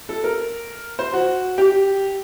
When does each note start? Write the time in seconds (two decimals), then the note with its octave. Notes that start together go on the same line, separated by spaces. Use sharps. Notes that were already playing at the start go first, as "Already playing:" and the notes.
0.09 A4
0.24 A#4
0.99 C5
1.13 F#4
1.58 G4